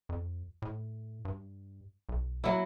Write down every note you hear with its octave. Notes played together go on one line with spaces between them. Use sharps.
F2
A2
G2
B1
F#3 A#3 E4